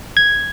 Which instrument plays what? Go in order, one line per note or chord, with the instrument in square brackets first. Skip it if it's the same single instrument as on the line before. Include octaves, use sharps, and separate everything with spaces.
[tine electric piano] G#6